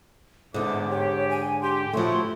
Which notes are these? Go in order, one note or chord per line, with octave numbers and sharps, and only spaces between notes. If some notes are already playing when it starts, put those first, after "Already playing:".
E2 G#2 D3 D6
G4 C#5
G#5
G4 C6
F3 A3 E4 F#4 C#5 C6